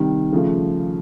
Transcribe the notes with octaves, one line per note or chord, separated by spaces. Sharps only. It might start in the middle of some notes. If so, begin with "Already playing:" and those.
Already playing: C3 D#3 G3
C#3 F3 A3